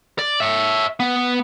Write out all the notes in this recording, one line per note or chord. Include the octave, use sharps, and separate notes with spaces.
D5
C#5 E5
B3